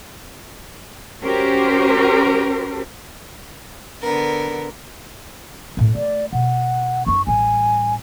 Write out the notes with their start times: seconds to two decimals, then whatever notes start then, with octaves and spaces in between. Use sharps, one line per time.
1.24 C#4 F#4 G4 A#4 C5
4.02 D3 B3 A#4
5.77 F#2 A2
5.95 A3 D5
6.33 B2 F#5
7.06 F#2 D#4 C#6
7.27 A1 G3 G#5